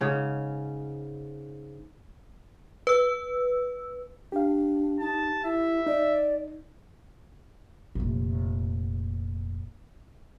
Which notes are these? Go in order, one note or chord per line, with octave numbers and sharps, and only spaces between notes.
G#2 C#3 C#4
B4 E6
D4 G4 F5
D#4 A5
E4 E5
D#4 D5
F1 A#2